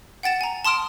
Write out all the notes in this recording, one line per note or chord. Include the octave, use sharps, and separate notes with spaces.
F#5 G5 A6 E7
G#5 A#5
A5 C6 D#6 F6 D7